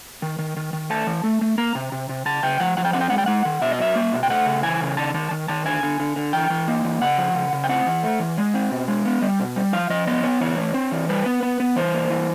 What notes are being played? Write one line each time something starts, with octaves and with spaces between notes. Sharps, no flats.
D#3
D#3
D#3
D#3
A3 A5
E3
A3
A3
A#3 A#5
C3
C3
C3
C#3 A5
C#3 G5
F3 F#5
F3 F#5
G5
C4 F#5
G5
G#3 F#5
G5
G#3 F#5
D#3
B2 E5
D#5
F#3 E5
A#3
B2
G5
A3 F#5
C#3
E3 G#5
C#3
D#3 A5
D#3 A5
D#3
D#3 A5
D3 G#5
D3
D3
D3
E3 G5
E3
A#3
E3
C#3 F#5
F3
C#3
C#3
G5
C4 F#5
E3
A3
E3
G#3
C4
B2
G#3
B3
G3
B2
G3
F3 F5
F3 D#5
B3 D#5
B3 C#5
E3 C#5
A2
C4
E3
G3 B4
B3
B3
B3
E3 C5
A#3
E3